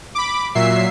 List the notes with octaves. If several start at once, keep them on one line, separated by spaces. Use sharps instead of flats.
B5 D6
A#2 F#3 E5 C7